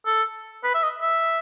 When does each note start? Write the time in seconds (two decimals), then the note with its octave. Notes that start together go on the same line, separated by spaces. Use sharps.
0.06 A4
0.64 B4
0.74 E5
0.83 D#5
1.02 E5